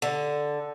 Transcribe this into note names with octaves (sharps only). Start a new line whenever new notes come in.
D3